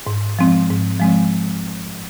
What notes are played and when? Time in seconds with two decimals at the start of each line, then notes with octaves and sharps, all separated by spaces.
0.07 G#2
0.39 F3 G#3 C4
0.70 G#2
1.00 F3 G#3 C4